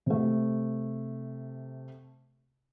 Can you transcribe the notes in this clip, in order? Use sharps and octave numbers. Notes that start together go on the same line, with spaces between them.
C3 A3